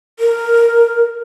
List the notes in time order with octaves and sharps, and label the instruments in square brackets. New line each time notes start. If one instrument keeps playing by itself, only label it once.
[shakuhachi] A#4